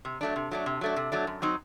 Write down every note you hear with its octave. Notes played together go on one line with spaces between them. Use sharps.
C3
F#3 A3 D4
C3
F#3 A3 D4
C3
F#3 A3 D4
C3
F#3 A3 D4
F#2
F#3 C4 D#4